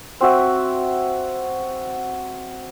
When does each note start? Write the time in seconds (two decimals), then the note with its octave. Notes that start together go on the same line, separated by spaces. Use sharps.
0.21 C4 F#4 E5